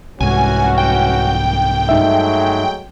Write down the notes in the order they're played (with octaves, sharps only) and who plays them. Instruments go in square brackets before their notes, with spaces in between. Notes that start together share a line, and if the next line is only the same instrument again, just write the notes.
[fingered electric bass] C2 G#2 [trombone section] E3 C#4 F#4 [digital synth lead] G#5
[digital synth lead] G5
[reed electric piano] G2 D#4 E5 [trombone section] F#3 G#3 A3